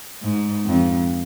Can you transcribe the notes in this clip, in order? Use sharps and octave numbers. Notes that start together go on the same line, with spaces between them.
G#2
F2